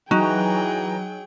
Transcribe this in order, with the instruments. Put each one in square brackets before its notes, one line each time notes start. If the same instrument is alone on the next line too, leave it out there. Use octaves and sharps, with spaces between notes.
[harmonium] E3 A#5 [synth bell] F#3 [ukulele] D#4 [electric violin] G#4 G5